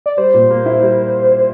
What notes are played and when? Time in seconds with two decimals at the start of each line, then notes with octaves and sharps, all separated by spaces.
0.06 D5
0.17 G3 C5
0.34 A#2
0.50 A#3
0.66 E4
0.82 G3